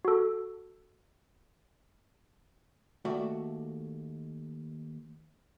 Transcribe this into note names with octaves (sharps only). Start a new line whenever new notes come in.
F#4 A4
D#2 A3 F#4 D5 E5